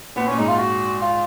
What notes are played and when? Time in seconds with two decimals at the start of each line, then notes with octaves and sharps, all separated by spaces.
0.16 A#2 B3
0.27 A#2 C#4
0.38 G#2 D#4
0.48 F4
0.58 F#4
1.02 F4